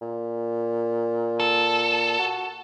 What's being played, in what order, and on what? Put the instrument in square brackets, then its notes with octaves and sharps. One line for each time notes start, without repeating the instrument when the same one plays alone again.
[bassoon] A#2
[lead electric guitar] A4
[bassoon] F#4